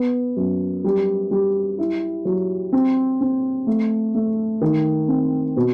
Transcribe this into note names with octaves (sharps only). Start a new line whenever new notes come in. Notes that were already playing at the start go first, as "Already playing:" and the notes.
Already playing: B3
F#2
G3
G3
E4
F#3
C4
C4
A3
A3
D#3
C4
B2